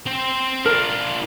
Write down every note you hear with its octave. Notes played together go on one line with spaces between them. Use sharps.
C4 C5
D4 F4 A#4